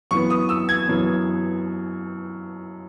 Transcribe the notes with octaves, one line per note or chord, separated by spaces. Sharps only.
F#2 E3 B3 C#6
D#6
E6
G#6
F#2 E3 B3